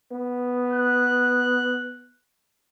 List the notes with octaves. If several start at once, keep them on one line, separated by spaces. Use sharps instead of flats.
B3
F#6